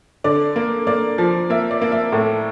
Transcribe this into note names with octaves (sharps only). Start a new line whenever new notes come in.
D3 D5
A#3
A#3 D5
F3
A#3 E5
D5
A#3
E5
A2 E5